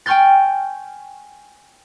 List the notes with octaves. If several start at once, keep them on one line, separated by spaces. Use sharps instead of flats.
G5 G#5 C#6 F6 G6 A6